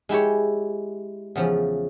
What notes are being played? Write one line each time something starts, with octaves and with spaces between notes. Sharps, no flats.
G#3 E4 G4 C#5
E2 C#3 F3